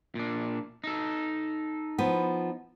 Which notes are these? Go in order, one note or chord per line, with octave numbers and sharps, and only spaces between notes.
A#2 D4
D#4 A4
F3 B3